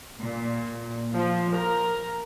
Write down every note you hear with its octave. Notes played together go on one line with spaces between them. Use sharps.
A#2
F3
A#4